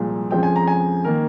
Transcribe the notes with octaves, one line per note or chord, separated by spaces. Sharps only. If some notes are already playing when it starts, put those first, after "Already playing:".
Already playing: C2 A#2 F3 G#3
F2 C#3 F3 G#3 G5
G#5
A#5
G#5
D#3 A#3 A#4